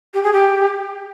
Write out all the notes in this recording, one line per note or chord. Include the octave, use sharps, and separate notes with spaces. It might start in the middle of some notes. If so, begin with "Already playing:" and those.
G4
G#4
G4